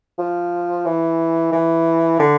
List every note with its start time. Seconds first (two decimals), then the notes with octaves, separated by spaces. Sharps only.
0.18 F3
0.86 E3
1.52 E3
2.19 D3